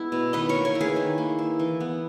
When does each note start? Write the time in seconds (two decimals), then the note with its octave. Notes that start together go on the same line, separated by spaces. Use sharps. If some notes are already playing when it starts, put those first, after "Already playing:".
Already playing: G#3 B3 E4
0.12 B2
0.33 D#3 B4 D#5
0.49 A#4 C#5
0.55 A#3
0.65 A#4 C#5
0.75 E4
0.81 G#4 B4
0.96 D#3
1.18 A#3
1.39 E4
1.59 E3
1.80 B3